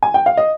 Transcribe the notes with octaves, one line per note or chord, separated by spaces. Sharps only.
G#5
G5
F5
D#5